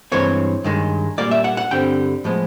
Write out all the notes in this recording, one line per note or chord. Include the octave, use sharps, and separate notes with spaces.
G2 E3 G#3 C4 C#5
G2 D#3 G#3
A#2 G3 A#3 D5
E5
F#5
F#5
G2 D3 G3 C4 G5
A2 F3 G#3 B3